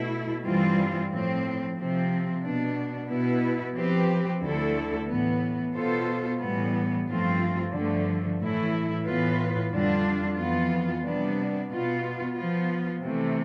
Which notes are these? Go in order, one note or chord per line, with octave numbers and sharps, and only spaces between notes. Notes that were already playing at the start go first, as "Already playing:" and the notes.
Already playing: B2 A3 E4
G2 E3 G3 C4 F4
A2 F3 C4
C3 F3 C4
B2 B3 D4
B2 B3 E4 B4
F3 C4 G4 B4
D2 D3 A3 E4 A4
A2 E3 B3
B2 B3 F4 A4 C5
A2 E3 G3 B3
G2 F3 A3 C4 F4
G2 D3 F3 A3
A2 E3 A3 E4
A2 E3 B3 F4 B4
F2 D3 G3 D4 F4
F2 E3 B3 F4
C3 G3 B3 D4
B2 B3 F4
F3 B3 F4
C3 E3 A3